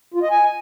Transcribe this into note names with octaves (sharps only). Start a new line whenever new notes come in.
F4
D#5
G#5